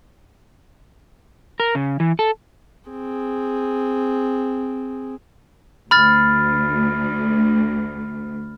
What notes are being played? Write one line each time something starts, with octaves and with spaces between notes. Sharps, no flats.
A#4
C#3
E3
A4
C4 G#4
D2 B5 F6 A6